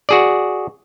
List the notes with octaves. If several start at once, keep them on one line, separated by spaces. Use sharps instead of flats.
F#4 G#4 D5